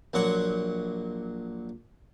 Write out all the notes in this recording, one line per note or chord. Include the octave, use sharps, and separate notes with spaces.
A#1 A#2 F#3 F#5 C6 C#6